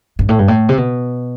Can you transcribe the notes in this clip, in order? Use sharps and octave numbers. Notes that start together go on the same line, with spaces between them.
G2
A2
G2
A2
C3
B2